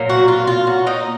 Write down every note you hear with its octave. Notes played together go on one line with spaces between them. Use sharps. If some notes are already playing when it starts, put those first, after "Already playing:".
Already playing: A#2 F#3 A#3
F#4
F4
F4
F#4
D#4 D#5